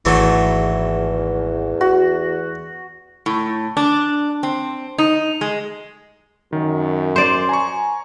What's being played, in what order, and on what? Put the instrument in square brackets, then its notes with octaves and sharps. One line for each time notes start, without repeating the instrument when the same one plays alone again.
[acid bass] G#1 [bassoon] E2 [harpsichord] E3 F#3 A3
[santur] F#4
[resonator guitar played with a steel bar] A2
D4
C4
D#4
G#3
[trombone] F#2 [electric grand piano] D#3
[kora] C5 D5 [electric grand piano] C6
[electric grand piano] G#5 A#5 C#6